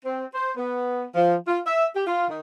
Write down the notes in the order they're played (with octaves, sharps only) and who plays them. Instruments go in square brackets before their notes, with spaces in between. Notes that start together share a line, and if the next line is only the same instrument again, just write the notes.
[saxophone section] C4
C5
B3
F3
F4
E5
G4
F4
D#3